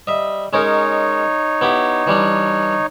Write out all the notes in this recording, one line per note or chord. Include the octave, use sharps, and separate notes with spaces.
G3 D#5 E5
G#3 C#4 D#4 A#4 C#5
B3 E4 G4
E3 G3 D4